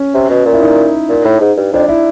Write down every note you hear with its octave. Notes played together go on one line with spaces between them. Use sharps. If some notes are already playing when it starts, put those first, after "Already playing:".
Already playing: C#4
C3
B2
A#2
E4
D#4
A#2
A2
G#2
G2
F2 D4
E4